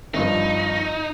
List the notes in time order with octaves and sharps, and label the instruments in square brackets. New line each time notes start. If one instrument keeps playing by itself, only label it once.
[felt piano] G#1 G2 F3 [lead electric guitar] D#4